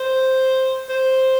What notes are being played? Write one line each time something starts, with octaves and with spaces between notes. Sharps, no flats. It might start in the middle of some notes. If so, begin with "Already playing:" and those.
Already playing: C5
C5